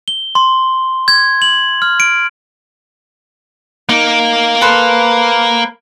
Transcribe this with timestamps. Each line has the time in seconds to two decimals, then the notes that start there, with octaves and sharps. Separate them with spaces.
0.08 G7
0.35 C6
1.08 G#6
1.42 F#7
1.82 F6
2.00 D7
3.89 A#3 D#4
4.61 A4 B4 C5